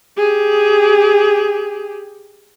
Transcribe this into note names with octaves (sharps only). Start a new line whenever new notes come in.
G4 G#4